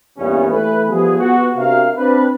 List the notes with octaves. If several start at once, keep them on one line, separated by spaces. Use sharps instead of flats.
E2 G2 A#2 B3 C#4
E3 A3 A4 B4
F3 G3 B3 G#4
B3 F#4
C3 D4 F#4 A#4 F5
C4 D4 B4